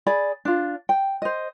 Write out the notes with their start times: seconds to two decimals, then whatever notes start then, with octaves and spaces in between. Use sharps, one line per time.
0.06 G#4 D5 B5
0.45 D4 F4
0.89 G5
1.22 C5 D#5